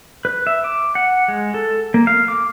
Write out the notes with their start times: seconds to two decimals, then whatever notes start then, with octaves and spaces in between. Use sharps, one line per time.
0.25 B4
0.47 E5
0.64 D6
0.95 F#5
1.28 G#3
1.54 A4
1.94 A#3
2.07 F5
2.28 D6